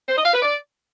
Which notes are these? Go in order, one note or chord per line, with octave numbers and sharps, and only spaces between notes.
C5
D#5
F5
B4
D5